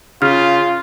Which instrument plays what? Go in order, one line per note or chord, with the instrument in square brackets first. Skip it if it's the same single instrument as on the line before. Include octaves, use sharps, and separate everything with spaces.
[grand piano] C#3 [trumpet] F4 [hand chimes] F6